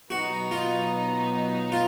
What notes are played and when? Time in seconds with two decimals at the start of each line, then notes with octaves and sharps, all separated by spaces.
0.10 B2 F#3 B3 D#4 F#4
0.51 F4
1.72 F4